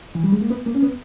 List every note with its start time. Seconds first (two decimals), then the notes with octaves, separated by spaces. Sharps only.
0.15 E3
0.24 G3
0.32 G#3
0.41 A#3
0.50 B3
0.66 A#3
0.75 C#4
0.83 B3